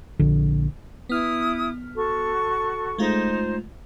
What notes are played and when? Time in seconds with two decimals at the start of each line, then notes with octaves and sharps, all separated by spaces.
0.19 A#1 D3
1.09 B3 E4 D#6 F6
1.95 F#4 A4 C#6
2.98 G#3 A3 D#4 F4 C5